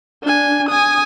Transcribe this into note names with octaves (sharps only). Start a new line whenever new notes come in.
D4 G#5
G#5 D#6